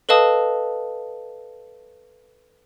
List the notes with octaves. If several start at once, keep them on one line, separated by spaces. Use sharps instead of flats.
A4 B4 D#5 F5 A5 D#6